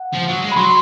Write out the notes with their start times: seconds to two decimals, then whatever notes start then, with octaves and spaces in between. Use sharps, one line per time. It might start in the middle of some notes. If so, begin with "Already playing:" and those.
Already playing: F#5
0.13 F3
0.28 F#3
0.42 G#3
0.52 B5
0.57 F#3 C6